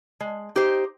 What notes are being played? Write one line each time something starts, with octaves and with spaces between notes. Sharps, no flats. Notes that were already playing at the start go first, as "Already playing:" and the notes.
G#3
D#4 G4 C5